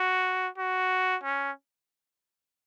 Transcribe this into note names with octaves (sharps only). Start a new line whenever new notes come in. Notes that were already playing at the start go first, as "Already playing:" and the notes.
Already playing: F#4
F#4
C#4